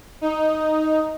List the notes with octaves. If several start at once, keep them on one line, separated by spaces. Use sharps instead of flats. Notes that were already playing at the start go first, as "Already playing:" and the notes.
D#4